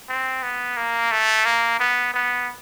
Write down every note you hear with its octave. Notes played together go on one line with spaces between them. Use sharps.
C4
B3
A#3
A3
A#3
B3
B3